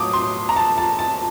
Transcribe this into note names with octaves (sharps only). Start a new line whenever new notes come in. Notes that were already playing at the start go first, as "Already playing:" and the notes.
Already playing: A2 F#3 A#3 D6 D#6
C6
A#5
A5
A5
A5